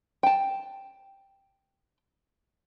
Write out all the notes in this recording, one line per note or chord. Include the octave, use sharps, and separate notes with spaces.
G5 A5